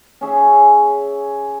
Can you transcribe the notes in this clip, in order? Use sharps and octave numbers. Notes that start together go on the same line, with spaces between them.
C#4 G#4 E5